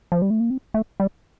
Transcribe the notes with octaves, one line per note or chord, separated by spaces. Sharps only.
F3
G3
A3
A#3
C4
A3
G3